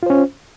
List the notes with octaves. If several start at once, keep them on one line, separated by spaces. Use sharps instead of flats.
C#4 F4 C5